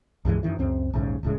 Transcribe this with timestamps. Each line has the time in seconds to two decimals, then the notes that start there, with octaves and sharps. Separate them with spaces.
0.25 C#2 G2 E3 G#3
0.43 F#2 D#3 E3
0.59 C#2 F#2 C4
0.93 A#1 D#2 G#2 C#3
1.23 D1 A2 C#3 G#3